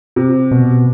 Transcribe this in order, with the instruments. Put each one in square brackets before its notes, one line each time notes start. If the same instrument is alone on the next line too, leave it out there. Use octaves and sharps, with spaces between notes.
[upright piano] C3
[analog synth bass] B2